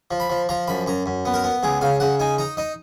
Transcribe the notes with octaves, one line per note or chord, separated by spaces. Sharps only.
F3
B5
F3
F3 A#5
F#2 B5
F#2 A#5
F#2
B3
A#4
B3
C#2 G#4
C#3 F5
C#3 F#5
D#4 G#5
D#4 A#5
D#4 D#5